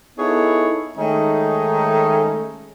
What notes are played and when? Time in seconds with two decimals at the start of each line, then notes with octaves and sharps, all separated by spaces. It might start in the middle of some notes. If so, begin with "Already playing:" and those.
0.18 B3 D#4 E4 G#4 A4 C#5
0.97 D#3 G#3 A3 C#4 D#4